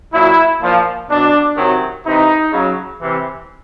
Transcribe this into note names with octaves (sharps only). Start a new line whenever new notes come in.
A#2 F#3 E4
A#2 F3
B2 F#3 D4
C3 D#3 F#3
C3 E3 D#4
C#3 F#3
C3 E3